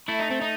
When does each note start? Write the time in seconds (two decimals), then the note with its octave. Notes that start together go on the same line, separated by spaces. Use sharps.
0.08 A3 E4
0.20 D#4
0.31 C4
0.41 D#4